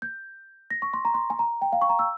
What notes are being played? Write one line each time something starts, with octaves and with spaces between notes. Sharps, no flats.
G6
A#6
C#6
C6
A#5
C6
G#5
A#5
G5
F5
C#6
A#5
E6